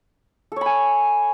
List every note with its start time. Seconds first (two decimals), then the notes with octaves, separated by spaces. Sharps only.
0.52 A4
0.56 C#5
0.61 B5
0.66 G#5